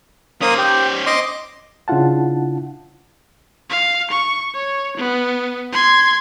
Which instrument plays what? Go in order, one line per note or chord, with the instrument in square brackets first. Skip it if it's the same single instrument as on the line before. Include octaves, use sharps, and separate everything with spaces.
[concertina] A#3 D#6 [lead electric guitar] C#4 C5
[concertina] G4
D#5 C6 D6
[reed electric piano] C#3 D4 E4 F4 F#5 A5
[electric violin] F5
C#6
C#5
B3
C6 G#6